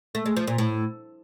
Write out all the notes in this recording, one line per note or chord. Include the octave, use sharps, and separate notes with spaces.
A3
G#3
F3
A#2
A2